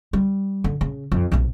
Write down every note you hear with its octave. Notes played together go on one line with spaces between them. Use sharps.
G3
D3
C#3
F2
B1 C3